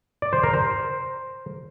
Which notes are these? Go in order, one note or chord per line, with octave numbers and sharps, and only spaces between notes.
D5
C5
A#4
C5